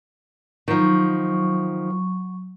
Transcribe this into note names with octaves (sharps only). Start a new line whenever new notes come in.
D#3 F3 F#3 C#6